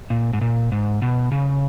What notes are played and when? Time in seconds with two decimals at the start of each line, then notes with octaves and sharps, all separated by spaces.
0.10 A#2
0.33 G#2
0.41 A#2
0.72 G#2
1.02 B2
1.32 C#3